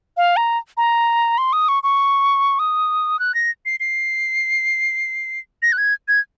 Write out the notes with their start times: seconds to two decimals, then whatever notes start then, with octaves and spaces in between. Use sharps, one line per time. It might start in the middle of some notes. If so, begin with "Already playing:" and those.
0.17 F5
0.36 A#5
0.77 A#5
1.38 C6
1.53 D#6
1.68 C#6
1.83 C#6
2.59 D#6
3.19 F#6
3.34 A#6
3.66 C7
3.80 C7
5.62 A#6
5.72 F#6
5.78 G#6
6.08 G#6